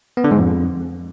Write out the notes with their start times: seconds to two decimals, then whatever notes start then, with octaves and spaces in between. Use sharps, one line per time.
0.17 B3
0.24 D3
0.31 G#2
0.38 F2